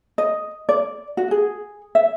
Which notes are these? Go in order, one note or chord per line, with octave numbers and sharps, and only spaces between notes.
D#5
D5
F#4
G#4
E5